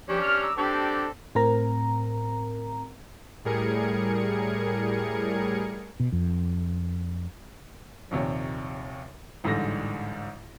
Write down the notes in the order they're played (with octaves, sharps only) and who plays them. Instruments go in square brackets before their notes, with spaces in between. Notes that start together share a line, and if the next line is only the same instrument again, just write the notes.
[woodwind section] F3 G4 [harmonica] G3 C#4 D4
[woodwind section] F6
A#5 D6 E6
[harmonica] C4 A4 D5 [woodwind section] D4 G4
[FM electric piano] A2 C4 A#4 A#5
[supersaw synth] A2 G3 G#4 A#4 G#6 C#7
[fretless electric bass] B2
F2
[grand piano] A#1 D#2 C3 C#5
A1 G#2 D3 G3 A#6